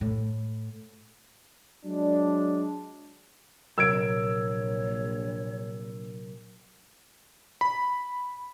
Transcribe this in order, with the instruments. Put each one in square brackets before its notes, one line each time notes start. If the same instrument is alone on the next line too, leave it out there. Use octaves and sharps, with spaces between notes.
[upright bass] A2
[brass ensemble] F#3 G#3 D4
[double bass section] A#1 [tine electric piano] C3 F#3 A#4 [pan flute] C#5 [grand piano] E6 G#6 D7
[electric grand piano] B5